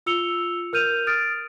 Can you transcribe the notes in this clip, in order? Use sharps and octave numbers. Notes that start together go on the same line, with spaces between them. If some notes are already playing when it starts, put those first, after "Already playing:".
F4 E6 C#7 F7 G7
A#4 F6 G6 D#7 F7
D#6 F6 A6 D7